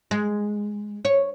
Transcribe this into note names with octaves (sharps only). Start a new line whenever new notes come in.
G#3
C#5